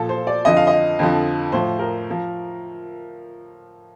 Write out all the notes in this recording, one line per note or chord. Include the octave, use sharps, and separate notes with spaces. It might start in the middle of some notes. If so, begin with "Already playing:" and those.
Already playing: A#2 F3 A4
C5
D5
F2 D3 F3 D#5
F5
D#5
F2 D3 F3
A2 F3 C5
A#4
F3